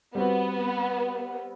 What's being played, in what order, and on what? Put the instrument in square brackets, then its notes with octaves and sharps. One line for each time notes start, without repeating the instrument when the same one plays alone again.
[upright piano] G3 C4 F#4 [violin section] B3